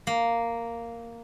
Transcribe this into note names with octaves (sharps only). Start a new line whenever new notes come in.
A#3